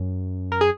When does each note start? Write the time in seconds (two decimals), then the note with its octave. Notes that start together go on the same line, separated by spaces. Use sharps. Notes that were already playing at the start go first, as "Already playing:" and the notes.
Already playing: F#2
0.52 A#4
0.61 G#4